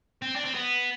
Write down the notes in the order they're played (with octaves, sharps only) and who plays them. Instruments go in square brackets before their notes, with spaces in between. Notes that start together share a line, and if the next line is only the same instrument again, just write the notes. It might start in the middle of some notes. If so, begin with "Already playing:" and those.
[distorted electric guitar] C4
D4
C4
B3